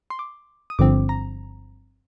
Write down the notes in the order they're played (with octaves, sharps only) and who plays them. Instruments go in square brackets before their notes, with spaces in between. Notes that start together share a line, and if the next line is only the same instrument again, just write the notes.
[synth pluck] C6
D6
D#6
G1 G2 D3 F3 C4 D6
A#5